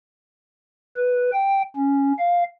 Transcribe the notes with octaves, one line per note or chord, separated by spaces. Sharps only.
B4
G5
C#4
F5